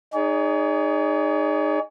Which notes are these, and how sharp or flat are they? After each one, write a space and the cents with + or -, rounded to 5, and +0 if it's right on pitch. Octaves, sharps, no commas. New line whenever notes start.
D#4 -20 G#4 -10 C#5 +40